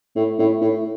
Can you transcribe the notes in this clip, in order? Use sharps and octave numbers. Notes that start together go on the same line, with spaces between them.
A2
A2
A2